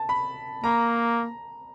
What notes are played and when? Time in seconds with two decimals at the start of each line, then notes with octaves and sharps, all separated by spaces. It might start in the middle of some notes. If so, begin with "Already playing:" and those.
Already playing: A5
0.09 B5
0.64 A#3 A#5